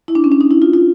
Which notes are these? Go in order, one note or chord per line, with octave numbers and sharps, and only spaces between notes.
E4
D4
C#4
D4
D#4
E4
F4
F4